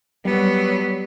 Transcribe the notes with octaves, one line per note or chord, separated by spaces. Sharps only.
F#3 G3 B3